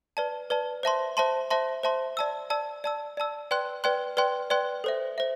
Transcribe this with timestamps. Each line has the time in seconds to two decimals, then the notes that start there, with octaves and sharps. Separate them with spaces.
0.17 B4 D5 A5
0.50 B4 D5 A5
0.83 C5 E5 A5 C6
1.17 C5 E5 A5 C6
1.50 C5 E5 A5 C6
1.83 C5 E5 A5 C6
2.17 D5 A5 E6
2.50 D5 A5 E6
2.84 D5 A5 E6
3.17 D5 A5 E6
3.51 B4 D5 G5 C6 F#6
3.84 B4 D5 G5 C6 F#6
4.17 B4 D5 G5 C6 F#6
4.50 B4 D5 G5 C6 F#6
4.84 A4 C5 E5
5.18 C5 E5